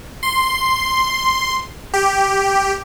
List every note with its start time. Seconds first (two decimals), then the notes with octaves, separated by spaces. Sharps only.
0.23 C6
1.94 G4